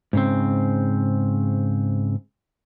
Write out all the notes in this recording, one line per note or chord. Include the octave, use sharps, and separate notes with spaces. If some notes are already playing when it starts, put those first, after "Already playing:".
G#2 C#3 C4